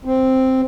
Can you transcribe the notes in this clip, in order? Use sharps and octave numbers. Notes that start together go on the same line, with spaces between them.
C4